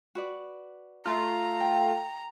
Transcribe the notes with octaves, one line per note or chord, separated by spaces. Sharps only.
F#4 B4 D5
A3 F4 A#5
G5